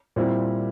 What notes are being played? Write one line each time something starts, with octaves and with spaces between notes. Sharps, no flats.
A#2 G3 C4 E4